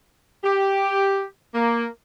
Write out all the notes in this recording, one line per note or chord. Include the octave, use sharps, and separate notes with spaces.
G4
A#3